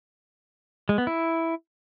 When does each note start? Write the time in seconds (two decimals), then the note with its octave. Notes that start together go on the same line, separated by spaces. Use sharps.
0.89 G#3
0.98 B3
1.07 E4